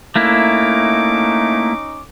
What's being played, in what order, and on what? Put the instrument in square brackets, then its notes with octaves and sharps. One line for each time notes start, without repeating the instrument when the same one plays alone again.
[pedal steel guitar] A3 A#3 E4 [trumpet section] C#4 D#4 D6